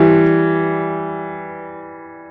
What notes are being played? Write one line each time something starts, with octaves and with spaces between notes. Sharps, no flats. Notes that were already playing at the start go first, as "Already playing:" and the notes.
Already playing: E3 G3